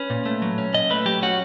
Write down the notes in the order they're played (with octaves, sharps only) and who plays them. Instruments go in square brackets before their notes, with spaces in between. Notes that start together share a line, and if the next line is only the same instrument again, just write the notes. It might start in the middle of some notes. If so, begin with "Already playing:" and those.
Already playing: [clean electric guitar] C#4 B4
A#2
A3
F#3
C#4
A#2 D#5
A3 B4
F#3 G4
C#4 F#4